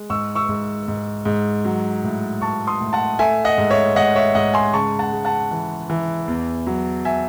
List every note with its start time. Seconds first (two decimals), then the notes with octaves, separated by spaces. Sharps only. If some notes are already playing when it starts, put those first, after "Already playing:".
Already playing: G#3
0.10 G#2 C#6 E6
0.35 C#6 E6
0.49 G#2
0.88 G#2
1.25 G#2
1.65 F#3
2.04 A2
2.41 A2 A5 C#6
2.67 C6 D#6
2.81 A2
2.93 F#5 A5
3.19 A3 E5 G#5
3.45 D#5 F#5
3.58 G#2
3.70 C#5 E5
3.96 G#2 D#5 F#5
4.16 C#5 E5
4.35 G#2 D#5 F#5
4.54 G#5 C6
4.73 C#3 A5 C#6
4.99 F#5 A5
5.12 G#3
5.25 F#5 A5
5.51 E3
5.90 E3
6.28 E2
6.67 F#3
7.05 E5 G#5